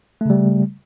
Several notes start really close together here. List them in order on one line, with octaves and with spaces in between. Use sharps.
A3 C#3 G3